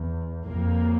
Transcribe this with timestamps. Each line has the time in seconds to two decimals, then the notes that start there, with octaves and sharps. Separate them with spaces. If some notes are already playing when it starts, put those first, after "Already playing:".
Already playing: E2
0.47 F2 A#3